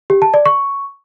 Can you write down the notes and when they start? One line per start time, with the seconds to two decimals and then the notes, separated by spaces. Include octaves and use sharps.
0.10 G4
0.22 A5
0.34 D5
0.46 C#6